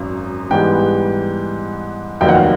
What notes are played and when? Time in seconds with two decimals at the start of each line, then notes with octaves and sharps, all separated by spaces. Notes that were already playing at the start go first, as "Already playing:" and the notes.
Already playing: G#1 F#2
0.51 G#2 E3 G3 B3 G5
2.21 F1 D#2 D#3 F#3 G5
2.28 F#5
2.35 F5